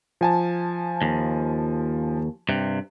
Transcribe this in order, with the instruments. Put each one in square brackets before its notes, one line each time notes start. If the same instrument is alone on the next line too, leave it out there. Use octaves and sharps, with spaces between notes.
[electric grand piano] F3 G#5 A5
[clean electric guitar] D#2
G2 C3